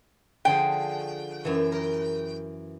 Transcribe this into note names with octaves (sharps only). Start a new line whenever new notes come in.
D3 F3 G#4 G5
F#2 E3
A#4